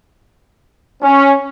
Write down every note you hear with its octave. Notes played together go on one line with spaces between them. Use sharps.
C#4